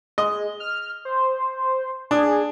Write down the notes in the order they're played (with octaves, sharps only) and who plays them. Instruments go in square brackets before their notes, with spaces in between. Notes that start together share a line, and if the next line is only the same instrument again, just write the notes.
[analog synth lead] G#3 [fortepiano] D#5
[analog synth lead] F6
C5
[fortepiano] D4 [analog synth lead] G#4